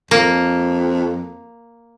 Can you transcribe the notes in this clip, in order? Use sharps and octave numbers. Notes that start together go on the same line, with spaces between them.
F2 A#3